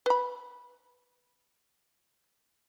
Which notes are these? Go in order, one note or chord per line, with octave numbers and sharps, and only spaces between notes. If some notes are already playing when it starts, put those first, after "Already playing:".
B4 B5